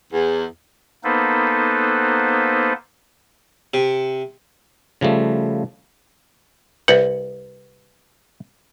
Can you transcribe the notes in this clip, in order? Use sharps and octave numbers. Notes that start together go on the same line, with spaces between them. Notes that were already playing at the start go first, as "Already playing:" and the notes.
E2
A#3 B3 D#4 A4 B4 C5
C3
C#3 F3 G3 A3
C2 B4 F#5